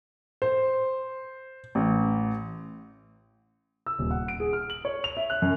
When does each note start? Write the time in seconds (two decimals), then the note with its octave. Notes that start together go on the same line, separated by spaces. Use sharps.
0.42 C5
1.75 A1
3.86 E6
3.99 D#1
4.11 F#5
4.28 D7
4.40 G#4
4.53 F6
4.70 F#7
4.85 C#5
5.04 F7
5.17 E5
5.30 F#6
5.42 F#2